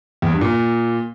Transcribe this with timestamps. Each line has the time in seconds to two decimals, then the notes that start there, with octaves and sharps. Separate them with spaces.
0.22 E2
0.32 G2
0.41 A#2